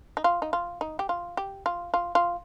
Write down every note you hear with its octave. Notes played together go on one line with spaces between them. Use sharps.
D#4
F4
D#4
F4
D#4
G4
F4
G4
F4
F4
F4